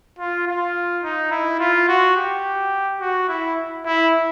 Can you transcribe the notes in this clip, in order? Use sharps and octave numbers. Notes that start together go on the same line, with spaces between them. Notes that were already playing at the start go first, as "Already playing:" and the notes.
F4
F4
D#4
E4
F4
F#4
G4
F#4
E4
E4